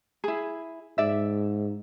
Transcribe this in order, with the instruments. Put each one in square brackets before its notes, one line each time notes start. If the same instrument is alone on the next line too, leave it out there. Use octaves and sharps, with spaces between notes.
[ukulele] E4 G#4
[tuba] G#2 [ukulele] D5 E5